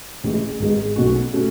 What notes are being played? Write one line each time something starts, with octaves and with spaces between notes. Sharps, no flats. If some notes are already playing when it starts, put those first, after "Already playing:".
A1 A2 G#3
G#1 G#2 G#3 B3
B1 B2 A3 C#4 F#4
B2 A3 C#4 F#4